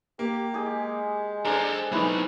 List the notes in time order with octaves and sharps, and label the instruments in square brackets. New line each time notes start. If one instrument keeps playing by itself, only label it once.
[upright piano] A#3 [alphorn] G4
[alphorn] G#3 [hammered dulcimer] G4 G#4
[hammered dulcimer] D4 C5 [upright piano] G#4 [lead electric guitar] A4 A#5
[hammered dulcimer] E3 G#3 [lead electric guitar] F#3 D#4 [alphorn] A3